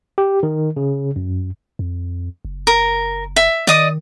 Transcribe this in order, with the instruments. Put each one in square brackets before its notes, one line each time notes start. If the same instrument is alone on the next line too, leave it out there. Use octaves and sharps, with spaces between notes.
[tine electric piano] G4
D#3
C#3
F#2
[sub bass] F2
F#1
[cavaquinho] A#4
E5
[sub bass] D#3 [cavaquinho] D5 D#5 D#6